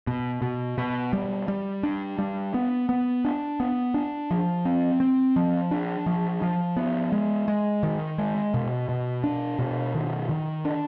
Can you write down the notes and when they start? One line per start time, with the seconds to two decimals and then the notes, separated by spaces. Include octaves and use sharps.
0.07 B2
0.42 B2
0.78 B2
1.13 G3
1.48 G3
1.83 D4
2.19 G3
2.54 B3
2.89 B3
3.25 D4
3.60 B3
3.94 D4
4.31 F3
4.65 C4
5.00 C4
5.36 F3
5.71 D4
6.06 F3
6.42 F3
6.77 B3
7.12 G#3
7.48 G#3
7.83 D#3
8.18 G#3
8.54 B2
8.89 B2
9.24 D4
9.59 B2
9.95 D#3
10.29 D#3
10.65 D4